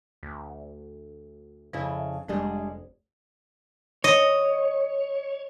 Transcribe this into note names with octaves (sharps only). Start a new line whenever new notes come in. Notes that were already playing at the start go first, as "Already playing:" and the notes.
D2
F2 C#3 E4 A5
F1 G3 G#3 D4
C#5 D#5